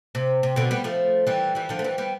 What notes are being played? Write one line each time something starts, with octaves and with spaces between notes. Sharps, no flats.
C3
C3
B2 D3
G3 B3
F3 A3
E3 G3
E3 G3
D3 F3
A3
E3 G3
G3 B3